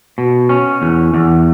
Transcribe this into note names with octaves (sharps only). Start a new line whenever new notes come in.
B2
C#4
E2
E2